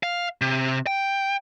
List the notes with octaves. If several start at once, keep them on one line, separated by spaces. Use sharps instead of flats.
F5
C3
G5